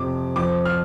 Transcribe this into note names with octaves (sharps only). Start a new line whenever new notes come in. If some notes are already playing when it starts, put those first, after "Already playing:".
Already playing: F2 C3 F3 D6
F2 F3 D6
F6